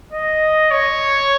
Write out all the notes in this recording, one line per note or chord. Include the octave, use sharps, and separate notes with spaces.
D#5
C#5